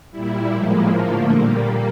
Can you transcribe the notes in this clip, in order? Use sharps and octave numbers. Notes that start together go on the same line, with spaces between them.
A#2 G3 E4
A2 F3 G#3 A#3
D3 F3 A3
A#2 G3